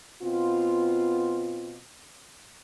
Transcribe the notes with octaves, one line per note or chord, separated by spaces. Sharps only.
B2 B3 C4 F4